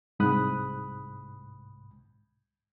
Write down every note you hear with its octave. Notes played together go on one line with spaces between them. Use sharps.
C2 G#2 B5 D#6 F#6